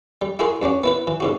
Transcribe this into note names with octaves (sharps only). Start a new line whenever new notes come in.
G3
E4 F#4 G#4 A#4 C6
G2 C#4 D4 F#4
B3 E4 B4
E3
G#2 C3 F#4